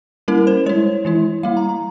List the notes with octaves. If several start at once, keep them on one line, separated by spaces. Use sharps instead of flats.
G3 A#3 C#4 E4 A#4
C5
G#3 E4 C#5
E3 G#3 E4
G3 A#3 E4 F5
A#5
A#5